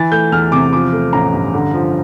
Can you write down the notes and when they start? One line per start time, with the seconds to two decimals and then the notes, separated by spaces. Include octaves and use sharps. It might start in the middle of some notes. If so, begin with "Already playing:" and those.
Already playing: E3 A6
0.12 A3 G6
0.32 E2 F6
0.52 C3 D6
0.73 F3 D6
0.93 A3
1.13 A1 A#5
1.34 G2
1.53 D3
1.74 F3